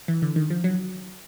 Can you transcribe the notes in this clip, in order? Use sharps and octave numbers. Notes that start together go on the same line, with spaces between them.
E3
D3
D#3
F3
F#3